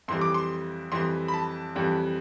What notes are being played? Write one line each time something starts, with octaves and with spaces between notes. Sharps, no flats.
F2 E3 G3 C6
D6
C6
F2 E3 G3 C6
B5
A5
F2 E3 G3